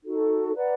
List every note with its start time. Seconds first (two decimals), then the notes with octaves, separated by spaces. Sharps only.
0.04 D#4 F#4 A4
0.55 B4 D5 F#5 A#5